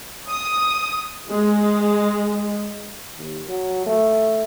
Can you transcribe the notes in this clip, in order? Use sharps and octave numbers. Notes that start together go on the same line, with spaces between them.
D#6
G#3
D#2
F#3
A3